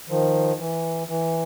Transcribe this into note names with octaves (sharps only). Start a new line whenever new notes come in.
D#3 F3
E3
E3